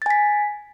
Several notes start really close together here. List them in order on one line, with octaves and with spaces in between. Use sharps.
A6 G#5 B6